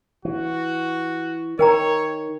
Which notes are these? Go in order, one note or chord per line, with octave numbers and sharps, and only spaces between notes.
E3 F#4
D#3 A#4 C#5 G5 A#5